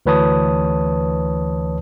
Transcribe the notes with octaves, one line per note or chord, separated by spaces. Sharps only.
D2 E3 B4 C#5 A5 D#6